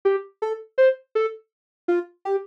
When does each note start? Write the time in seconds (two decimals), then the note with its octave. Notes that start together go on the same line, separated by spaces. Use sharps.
0.05 G4
0.42 A4
0.78 C5
1.15 A4
1.88 F4
2.25 G4